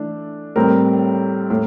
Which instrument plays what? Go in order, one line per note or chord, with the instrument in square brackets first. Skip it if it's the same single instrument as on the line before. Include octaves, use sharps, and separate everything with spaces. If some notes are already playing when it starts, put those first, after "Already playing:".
Already playing: [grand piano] E3 A3 D4
A2 G3 C4 A#4
A2